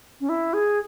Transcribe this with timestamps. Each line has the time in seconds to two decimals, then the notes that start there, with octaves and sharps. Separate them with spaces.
0.21 C#4
0.29 E4
0.54 G#4